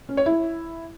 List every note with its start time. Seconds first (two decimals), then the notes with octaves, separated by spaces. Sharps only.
0.09 C#4
0.17 C#5
0.26 E4